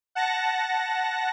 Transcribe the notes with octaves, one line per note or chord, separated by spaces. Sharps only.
F#5 A5 A#6